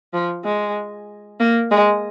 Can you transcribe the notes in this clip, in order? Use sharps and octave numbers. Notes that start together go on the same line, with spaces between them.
F3
G#3
A#3
G#3